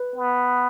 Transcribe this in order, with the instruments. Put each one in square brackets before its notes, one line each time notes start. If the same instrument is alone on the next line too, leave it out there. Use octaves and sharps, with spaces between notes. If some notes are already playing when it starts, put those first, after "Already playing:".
Already playing: [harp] B4
[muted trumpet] B3